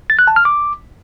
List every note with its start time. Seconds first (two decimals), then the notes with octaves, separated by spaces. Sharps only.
0.10 A6
0.19 F#6
0.27 A5
0.36 F6
0.45 D6